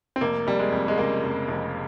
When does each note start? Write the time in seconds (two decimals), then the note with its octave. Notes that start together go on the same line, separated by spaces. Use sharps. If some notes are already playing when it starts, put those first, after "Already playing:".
0.16 C4
0.21 F1 A#3
0.47 F1 G3
0.59 G#3
0.72 F2
0.88 G#3
0.98 C#3 A#3
1.23 F1
1.48 F1